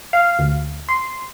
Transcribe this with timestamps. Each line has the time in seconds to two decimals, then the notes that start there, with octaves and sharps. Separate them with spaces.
0.13 F5
0.39 D2
0.89 C6